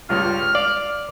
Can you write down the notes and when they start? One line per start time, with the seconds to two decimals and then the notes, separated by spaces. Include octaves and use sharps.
0.09 C#2 G2 F4 F6
0.55 D5 F5